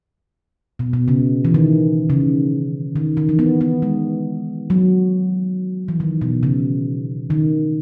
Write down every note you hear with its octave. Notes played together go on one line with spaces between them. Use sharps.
B2
B2
C#3
E3
D#3
C#3
D#3
D#3
E3
B3
B3
G#3
F#3
E3
D#3
B2
C#3
D#3